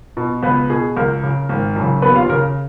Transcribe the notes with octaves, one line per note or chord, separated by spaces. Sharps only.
B2
C#2 B3 B4
B2 G#4
C#2 A#4
C#3
G#1
F#2 C#3
D#2 B3 B4
F4 F5
C#3 A#4